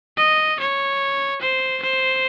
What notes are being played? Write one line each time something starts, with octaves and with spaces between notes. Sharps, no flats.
D#5
C#5
C5
C5